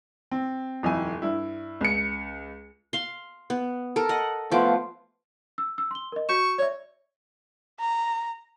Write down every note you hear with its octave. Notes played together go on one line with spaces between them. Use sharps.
C4
D#1 F2 E4 G#5
G2 E4
C#2 C#7
F5 C6
B3
A4 A#4
D#5 F#5
F3 A3 B3 F4 D6
E6
E6
C6 G7
A#4 D#5
F#4 C#6 G6 E7
C#5 D5 E5
A#5